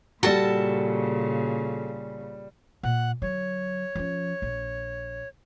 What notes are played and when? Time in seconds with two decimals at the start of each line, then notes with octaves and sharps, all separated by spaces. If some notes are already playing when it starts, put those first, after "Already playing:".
0.23 A#2 C#3 G3 F#4 A4 A5 A6 G7
2.83 A#2 F#5
3.22 D3 F#3 C#5
3.95 F3 C#4
4.42 A#1